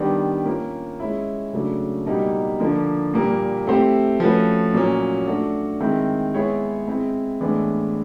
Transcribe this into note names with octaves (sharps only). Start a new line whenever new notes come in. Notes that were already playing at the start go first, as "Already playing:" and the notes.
Already playing: D#3 G3 B3 D4
A#3 C#4 F4
G#3 C#4 E4
C#3 F#3 A3 D4
B2 G3 A#3 D#4
D3 F3 A#3 D4
A#2 G3 A#3
A3 C4 E4 G4 C5
F3 A3 C#4 F#4 B4
A#2 F#3 A#3 C#4
A3 D4 F#4
D#3 G#3 C4 E4
G#3 B3 E4 G#4 C#5
G#3 C4 E4
A2 E3 G#3 B3 D4